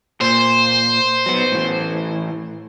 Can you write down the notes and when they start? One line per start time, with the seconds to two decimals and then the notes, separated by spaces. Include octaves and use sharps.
0.21 A#2 C5
1.26 F#3 B3
1.52 A2 E3